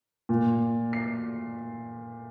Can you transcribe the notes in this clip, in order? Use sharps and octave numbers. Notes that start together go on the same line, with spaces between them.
A#2
C7